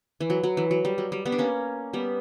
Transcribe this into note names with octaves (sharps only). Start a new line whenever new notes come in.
E3
F#3
F#3
E3
F#3
G3
F#3
G3
G3 B3
D4
A#3 C#4
G3 B3